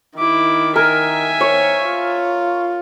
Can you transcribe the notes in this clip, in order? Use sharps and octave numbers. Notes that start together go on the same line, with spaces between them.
D#3 E4 D6
A#4 E5 G#5
C#5
F4